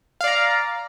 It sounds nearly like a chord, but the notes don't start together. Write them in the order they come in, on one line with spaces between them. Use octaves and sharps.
F5 D5 A#5